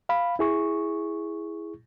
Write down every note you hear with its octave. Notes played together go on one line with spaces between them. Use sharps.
F5 B5
E4 G#4 C#6